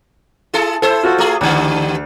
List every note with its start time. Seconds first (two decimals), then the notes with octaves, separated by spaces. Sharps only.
0.54 E4 G#4 A4
0.82 E4 A4 C5
1.04 F4 F#4 A4
1.18 A3 G#4
1.41 D2 G2 D3